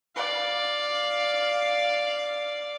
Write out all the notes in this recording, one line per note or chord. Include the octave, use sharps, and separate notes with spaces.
D5 F5